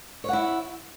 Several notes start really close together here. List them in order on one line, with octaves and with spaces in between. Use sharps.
C#5 F#5 E4